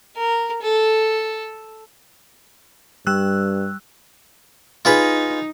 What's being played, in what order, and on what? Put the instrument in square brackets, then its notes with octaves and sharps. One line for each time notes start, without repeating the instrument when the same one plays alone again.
[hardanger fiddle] A#4
A4
[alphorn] G2 [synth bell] G3 E6 F#6
[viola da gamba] D#4 [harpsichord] F4 G#4 B4